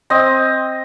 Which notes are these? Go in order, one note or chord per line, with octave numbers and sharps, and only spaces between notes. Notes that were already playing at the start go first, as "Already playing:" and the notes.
C4 D#5 E6